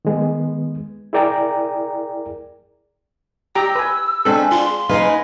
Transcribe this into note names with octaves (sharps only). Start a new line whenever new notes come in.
D#3 G#3 B3
E4 G#4 A#4 D5 G5 A#5
G4 G5 A#5 E6
B4 G#5
G#3 C4 D4 G#4 A4 B4
F4 C6
C#3 G#3 D#4 G#4 B4 F5